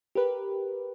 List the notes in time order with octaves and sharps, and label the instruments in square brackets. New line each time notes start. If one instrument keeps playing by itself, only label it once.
[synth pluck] G4 A#4 B4